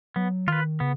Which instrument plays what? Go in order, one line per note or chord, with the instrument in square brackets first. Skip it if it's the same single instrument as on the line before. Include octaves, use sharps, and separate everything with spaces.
[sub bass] F#3 [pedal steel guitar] B3
[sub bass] D#3 [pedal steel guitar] F4 B4
[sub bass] C#3 [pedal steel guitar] B3